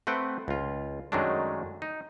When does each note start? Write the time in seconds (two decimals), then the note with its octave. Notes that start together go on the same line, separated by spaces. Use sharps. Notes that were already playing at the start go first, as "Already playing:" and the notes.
0.07 A3 C4 B4 F#5 G5
0.48 C#2 F4
1.12 F#2 D#3 F#3 G#3 A3 D4
1.82 D#4